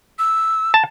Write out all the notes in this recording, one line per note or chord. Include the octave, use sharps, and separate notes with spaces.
E6
A5